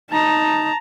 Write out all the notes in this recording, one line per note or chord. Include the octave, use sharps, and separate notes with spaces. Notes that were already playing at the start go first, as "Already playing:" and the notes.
D#4 A5 A#5